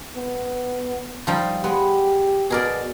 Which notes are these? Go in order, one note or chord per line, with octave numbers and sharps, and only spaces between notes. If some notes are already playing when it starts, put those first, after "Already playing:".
B3
F3 G3 D#4
G#3 B3 G4
B2 G#4 A#4 D5